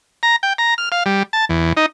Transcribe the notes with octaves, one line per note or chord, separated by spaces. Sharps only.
A#5
G5
A#5
F6
F5
G3
A5
E2
D#4